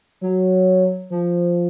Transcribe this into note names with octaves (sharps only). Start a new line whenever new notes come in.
F#3
F3